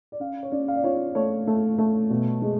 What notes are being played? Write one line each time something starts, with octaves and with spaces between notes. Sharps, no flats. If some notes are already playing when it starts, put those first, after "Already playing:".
D5
C#4 F5
C#5
C#4 D5
F5
D5
F4 C#5
A3 C#5
A3
A3
B2
G#3